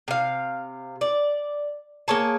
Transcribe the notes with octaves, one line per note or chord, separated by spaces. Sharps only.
C3 F5
D5
A#3 G#4 C#5 A5